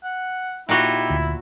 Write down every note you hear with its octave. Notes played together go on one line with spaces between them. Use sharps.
F#5
A#2 D#4 E4 F#4 G4
D2